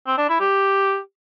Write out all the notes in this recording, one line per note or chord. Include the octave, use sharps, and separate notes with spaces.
C4
D4
E4
G4